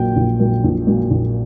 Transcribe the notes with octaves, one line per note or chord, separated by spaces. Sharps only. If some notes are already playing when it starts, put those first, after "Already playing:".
Already playing: A#1 A#2 F#3 G5
A#1
A#2 F#3
A#1
A#2 F#3
A#1